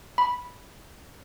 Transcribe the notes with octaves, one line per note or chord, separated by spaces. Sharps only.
B5